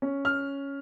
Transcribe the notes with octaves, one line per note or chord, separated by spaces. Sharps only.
C#4
F6